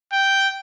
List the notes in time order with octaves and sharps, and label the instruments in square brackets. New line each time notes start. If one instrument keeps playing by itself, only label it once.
[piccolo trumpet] G5